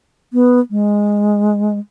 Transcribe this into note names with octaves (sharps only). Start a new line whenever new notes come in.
B3
G#3